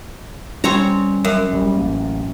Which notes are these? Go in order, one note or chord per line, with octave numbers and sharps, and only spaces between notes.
G3 C4 C#4 C#5 A#5
F#2
F#1 G3
A1 A#3